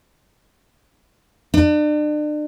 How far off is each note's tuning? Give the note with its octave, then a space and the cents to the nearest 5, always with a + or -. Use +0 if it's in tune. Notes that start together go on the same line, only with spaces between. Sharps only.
D4 +40